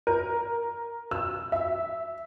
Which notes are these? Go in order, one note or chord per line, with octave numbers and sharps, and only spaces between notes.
A#4
E6
E5